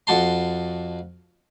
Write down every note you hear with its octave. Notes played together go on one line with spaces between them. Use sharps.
F2 F#4 A5 C6